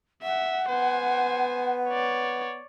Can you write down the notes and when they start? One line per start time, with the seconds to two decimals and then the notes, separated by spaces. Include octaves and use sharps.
0.22 E5 F#5
0.69 B3 C5 G#5
1.89 C#5 D5